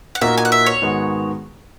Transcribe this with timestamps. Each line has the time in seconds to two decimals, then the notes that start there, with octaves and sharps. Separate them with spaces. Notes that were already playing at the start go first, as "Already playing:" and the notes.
0.15 F#5
0.21 A#2 A#3 D#4 F#4 E5
0.38 G#5
0.45 F#5
0.52 E5
0.66 C#5
0.82 G#2 D#3 G#3 B3 F#4